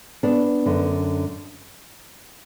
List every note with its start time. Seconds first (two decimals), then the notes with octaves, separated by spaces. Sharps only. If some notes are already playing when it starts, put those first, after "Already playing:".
0.23 B3 D4
0.66 F#2 D3